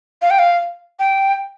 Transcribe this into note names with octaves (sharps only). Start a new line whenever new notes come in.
F5
G5
F5
G5